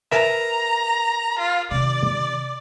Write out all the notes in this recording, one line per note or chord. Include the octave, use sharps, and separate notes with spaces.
A#4 B4 E5 A#5
F4
C3 D#3 D5